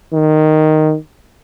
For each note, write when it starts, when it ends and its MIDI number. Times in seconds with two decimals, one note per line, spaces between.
0.14 0.96 51